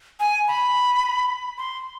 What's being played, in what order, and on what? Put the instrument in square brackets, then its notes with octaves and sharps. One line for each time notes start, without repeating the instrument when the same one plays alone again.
[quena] G#5
B5
C6